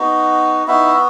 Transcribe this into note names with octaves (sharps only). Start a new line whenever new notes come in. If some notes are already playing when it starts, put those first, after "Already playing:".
Already playing: B3 D#4 F#4
B3 D#4 E4 F#4 E5